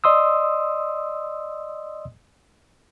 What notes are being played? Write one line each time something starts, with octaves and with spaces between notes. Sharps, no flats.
D5 D#5 C6 D#6 E6